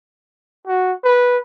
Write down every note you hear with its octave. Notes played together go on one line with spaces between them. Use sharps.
F#4
B4